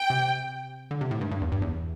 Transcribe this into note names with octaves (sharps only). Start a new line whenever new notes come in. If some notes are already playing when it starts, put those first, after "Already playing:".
Already playing: G5
C3
D3
C3
A2
G2
G2
E2
G2
E2